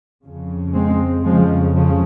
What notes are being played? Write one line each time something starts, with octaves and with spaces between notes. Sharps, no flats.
F2 C#3
G#3 C4
F2 C#3 F3 G#3
C#3 F3